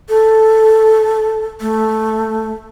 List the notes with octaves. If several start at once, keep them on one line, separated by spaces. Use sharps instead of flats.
A4
A3